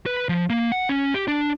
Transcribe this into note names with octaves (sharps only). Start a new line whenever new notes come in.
B4
F3
A#3
F#5
C#4
G4
D4